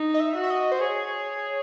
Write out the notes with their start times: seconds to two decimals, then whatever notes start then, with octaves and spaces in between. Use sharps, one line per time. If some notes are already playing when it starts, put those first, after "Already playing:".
Already playing: D#4
0.14 D#5
0.20 E5
0.35 F#4
0.43 E5
0.50 D#5
0.72 C5
0.81 G#4 C#5